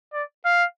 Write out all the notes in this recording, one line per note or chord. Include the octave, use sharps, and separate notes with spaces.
D5
F5